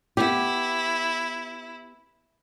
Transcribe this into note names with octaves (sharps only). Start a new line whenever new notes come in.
B3 E4 G4